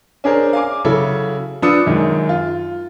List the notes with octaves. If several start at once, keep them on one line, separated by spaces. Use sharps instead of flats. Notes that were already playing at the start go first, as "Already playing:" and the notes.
C#4 D4 G#4 A#4 C5
F5 G#5 D6
C#3 F#3 E4 A4
F3 D4 B4 D#6 E6 C#7
F#2 D#3 G#3
F4